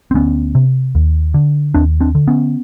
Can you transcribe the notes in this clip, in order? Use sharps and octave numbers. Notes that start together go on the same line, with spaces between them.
C4
D2 B3 C#4
C3
D#2
D3
D#2 C4 D4
C4 D4
D3
B3 C#4